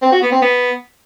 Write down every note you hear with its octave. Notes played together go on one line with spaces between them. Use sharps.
C4
F#4
B3
C4
B3